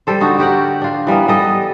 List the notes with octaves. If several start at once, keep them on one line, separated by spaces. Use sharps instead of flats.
G3 A4 C5
D3 D#4 F#4
F#4 G4 A#4 F#5
D4 F4
E3 G3 A#3 B3
G3 B3 A4 D#5